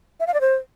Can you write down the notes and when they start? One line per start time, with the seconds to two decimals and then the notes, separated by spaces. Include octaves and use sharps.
0.20 E5
0.27 F5
0.34 D5
0.41 C5